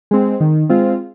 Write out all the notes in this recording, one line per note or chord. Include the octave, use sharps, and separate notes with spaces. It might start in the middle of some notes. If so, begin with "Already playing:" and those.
G#3 C4
D#3
G#3 C4 F4